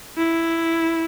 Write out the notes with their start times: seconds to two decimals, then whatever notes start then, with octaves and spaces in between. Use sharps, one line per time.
0.17 E4